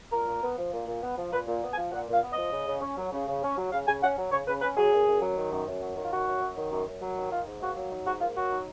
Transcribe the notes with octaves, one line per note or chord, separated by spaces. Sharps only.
A#2 A#4
A#2
B3
F3
A#2
A#2
B3
F3
A#2 B4
A#2
B3
G#5
F3
A#2 F#5
A#2 F5
B3
F3 D#5
C#3
C#3
C#4
F#3
C#3
C#3
C#4
F#3
C#3 F5
C#3 G#5
C#4 F#5
F#3
C#3 C#5
C#3 B4
C#4 B4
F#3 G#4
F#2
F#2
F#3
D#3
F#2
F#2
F#3
D#3
F4
F#2 F#4
F#2
F#3
D#3
F#2
F#2
F#3
D#3
D#4 F4
G#2
A#3 F#4
F#3
D#4
G#2 F#4
A#3 F4
F#3 F#4
D#4